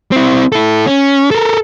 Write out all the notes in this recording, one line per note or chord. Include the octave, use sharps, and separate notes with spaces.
C4 E4
E4 A4
C#4
A4 A#4